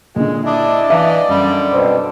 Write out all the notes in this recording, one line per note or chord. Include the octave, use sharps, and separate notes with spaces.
A#2 D3 G#3
D4 E4 D5 D#5
E3 F5 A5
F#2 D3 G3
B2 C4